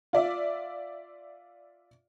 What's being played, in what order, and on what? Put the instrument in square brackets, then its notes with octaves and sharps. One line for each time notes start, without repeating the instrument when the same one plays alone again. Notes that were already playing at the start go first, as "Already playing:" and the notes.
[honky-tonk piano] F4 D5 E5